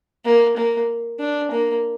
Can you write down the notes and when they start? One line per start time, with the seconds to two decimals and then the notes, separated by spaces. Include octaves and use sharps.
0.25 A#3
0.57 A#3
1.19 D4
1.51 A#3